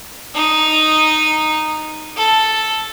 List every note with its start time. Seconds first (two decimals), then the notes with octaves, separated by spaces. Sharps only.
0.35 D#4
2.17 A4